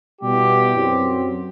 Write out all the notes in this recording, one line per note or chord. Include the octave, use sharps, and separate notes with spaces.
B2 G3 B3 E4 G4
F#2 F#3 C4